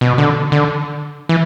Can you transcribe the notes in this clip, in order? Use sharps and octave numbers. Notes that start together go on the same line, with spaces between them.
B2
D3
D3
E3